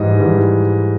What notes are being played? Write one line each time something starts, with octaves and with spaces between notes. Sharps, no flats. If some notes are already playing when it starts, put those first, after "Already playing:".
Already playing: G#2 E3 G3 D#5
G#2 E3 G3